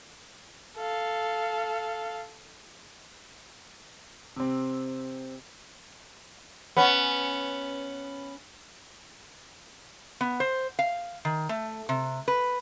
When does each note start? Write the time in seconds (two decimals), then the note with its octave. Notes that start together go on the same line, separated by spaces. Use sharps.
0.77 A4 F5
4.36 C3 C4
6.77 B3 C#4
10.21 B3
10.40 C5
10.79 F5
11.25 D#3
11.49 A3
11.89 C3
12.28 B4